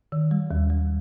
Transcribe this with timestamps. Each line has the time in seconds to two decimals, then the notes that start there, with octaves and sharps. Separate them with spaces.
0.12 D#3
0.31 G3
0.51 D#2
0.70 G3